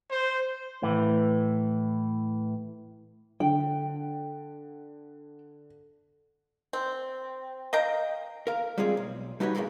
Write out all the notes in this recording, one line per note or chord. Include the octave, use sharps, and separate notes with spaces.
C5
A2 E3
D3 G5
C4
D#5 F5 G5 A#5
A#4 F5
G3 G#3 C4 F4 G#4
B1
G3 D#4 F#4 G4 B4 C#5
A2 D#3 G3 G#3 A#3